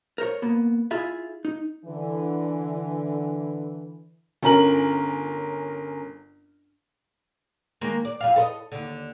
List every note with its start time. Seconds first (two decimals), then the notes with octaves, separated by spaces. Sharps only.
0.18 A#4 C5 C#5
0.42 A#3 B3
0.91 E4 F4 G#4 E5
1.45 D#4
1.86 D3 E3
4.43 G1 C#4 A#4 F#7
7.81 D#3 G#3 A#3
8.05 D5
8.21 F2 G3 F5
8.36 A4 B4 D#5
8.72 D#2 D3